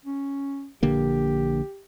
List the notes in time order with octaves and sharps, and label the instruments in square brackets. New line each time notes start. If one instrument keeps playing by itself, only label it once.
[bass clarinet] C#4
[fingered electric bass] A#1 D3 A#3 [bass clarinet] G4